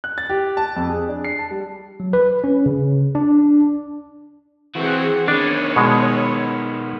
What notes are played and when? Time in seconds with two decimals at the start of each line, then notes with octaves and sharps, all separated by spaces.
0.04 F#6
0.18 A6
0.29 G4
0.57 A5
0.76 F2
0.89 G#4
1.09 D4
1.24 C7
1.39 A5
1.51 G3
2.00 F#3
2.13 B4
2.44 C#4
2.66 C#3
3.15 D4
4.76 E3 C4 F#4 G#4 F#5
5.28 D#3 B3 D4 C#5
5.76 B2 G#3